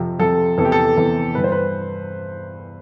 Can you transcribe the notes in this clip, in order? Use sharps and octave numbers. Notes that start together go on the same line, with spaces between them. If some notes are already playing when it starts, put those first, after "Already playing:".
Already playing: F2 C3 F3
F2 C3 F3 A4
E2 C3 E3 A4
G4
A4
E2 C3 E3
G2 E3 B4
C5
B4